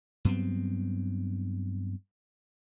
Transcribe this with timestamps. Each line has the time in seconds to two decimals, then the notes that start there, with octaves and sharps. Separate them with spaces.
0.25 G2 F#3 B3 C4